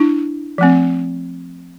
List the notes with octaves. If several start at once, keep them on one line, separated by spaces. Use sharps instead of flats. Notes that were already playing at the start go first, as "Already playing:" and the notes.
Already playing: D4 E4
F3 A3 C4